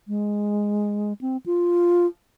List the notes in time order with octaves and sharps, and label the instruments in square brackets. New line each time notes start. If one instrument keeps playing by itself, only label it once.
[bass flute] G#3
C4
F4